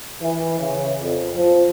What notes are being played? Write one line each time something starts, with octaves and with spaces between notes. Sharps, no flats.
E3
C#3
F2
F3